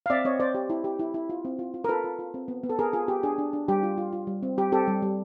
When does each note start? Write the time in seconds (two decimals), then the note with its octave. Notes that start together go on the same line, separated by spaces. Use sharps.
0.06 F5
0.10 C4 D5 E5
0.25 C4 C#5 D#5
0.40 C4 C5 D5
0.55 G4
0.70 E4
0.84 G4
0.99 E4
1.14 E4
1.30 F4
1.45 C4
1.59 F4
1.74 F4
1.84 A#4
1.89 F4 A4 B4
2.04 F4
2.19 F4
2.34 C4
2.48 B3
2.64 B3
2.70 A4
2.79 B3 G#4 A#4
2.93 F4 G#4
3.08 B3 G4
3.23 D4 G#4
3.38 D4
3.53 D4
3.68 G3 G4
3.83 F4
3.98 F4
4.13 F4
4.27 G3
4.43 C4
4.58 G3 G4
4.72 C4 G4 A4
4.88 G3
5.02 G3